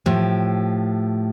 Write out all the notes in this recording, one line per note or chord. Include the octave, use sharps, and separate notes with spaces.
A2 F3 G4